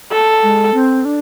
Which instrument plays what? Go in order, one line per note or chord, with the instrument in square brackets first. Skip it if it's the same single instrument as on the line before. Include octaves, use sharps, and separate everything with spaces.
[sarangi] A4
[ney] G#3
C4
D4